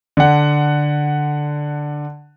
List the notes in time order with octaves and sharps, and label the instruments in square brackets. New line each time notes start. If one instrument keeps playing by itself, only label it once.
[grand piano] D3 F#5